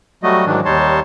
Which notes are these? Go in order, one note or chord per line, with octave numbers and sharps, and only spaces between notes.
F#3 G3 A3 F#4 D#5
G#2 D#3 E3 F#3 D4
D#2 G3 D#4 C#5 A5 C6